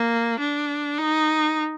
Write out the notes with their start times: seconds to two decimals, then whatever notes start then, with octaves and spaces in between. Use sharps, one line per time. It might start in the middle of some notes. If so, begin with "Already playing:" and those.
Already playing: A#3
0.40 D4
0.99 D#4